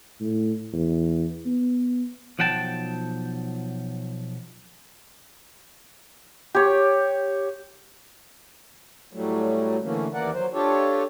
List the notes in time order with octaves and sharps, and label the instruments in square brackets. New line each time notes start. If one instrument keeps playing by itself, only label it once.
[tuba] A2
E2
B3
[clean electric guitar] B1 F3 F#5 G5 A5
[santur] G4 C#5
[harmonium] A2 F#3 G3 A3
D3 E3 A3 A#3 C#4
D#2 E3 A#3 A#4 D5 F#5
F#3 C5
D4 F4 G4 A4 C#5